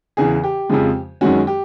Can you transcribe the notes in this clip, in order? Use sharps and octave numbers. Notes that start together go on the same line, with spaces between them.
E2 C#3 E3 G#4
G4
F2 C#3 F3 G#3
F#2 D#3 G#3 C#4 F#4
G4